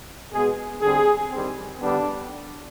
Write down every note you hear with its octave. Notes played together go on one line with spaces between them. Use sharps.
B2 G#3 B3 G#4
D3 G3 C4 G#4
D#3 G3 C4
D3 G3 B3 D4